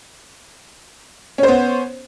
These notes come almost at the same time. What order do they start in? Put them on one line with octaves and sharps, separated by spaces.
C#4 C5 B3